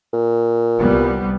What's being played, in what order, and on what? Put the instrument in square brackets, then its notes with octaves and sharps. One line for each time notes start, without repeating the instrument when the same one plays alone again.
[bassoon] A#2
[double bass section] C2 G3 B3